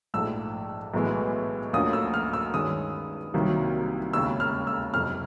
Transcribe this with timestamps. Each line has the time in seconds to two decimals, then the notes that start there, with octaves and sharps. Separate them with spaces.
0.14 A#1 G#2 F3 A3 E6
0.94 B1 A2 E3 G#3 B3
1.73 D2 D3 F3 A#3 C#4 D#6
1.93 E6
2.14 F6
2.33 E6
2.54 G2 D#3 G#3 C#4 D#6
3.34 C2 C3 D#3 F#3 A#3
4.13 E1 D#2 C#3 E6
4.40 F6
4.67 E6
4.94 F#1 F2 C3 F6